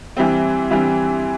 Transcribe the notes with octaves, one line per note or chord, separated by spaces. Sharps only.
E3 G3 C4
E3 G3 C4